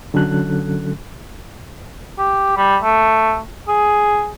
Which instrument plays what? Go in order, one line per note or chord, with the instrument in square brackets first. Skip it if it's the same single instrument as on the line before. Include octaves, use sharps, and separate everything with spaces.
[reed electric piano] D3 F#3 C#4 A4 F#6
[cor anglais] G4
G3
A3
G#4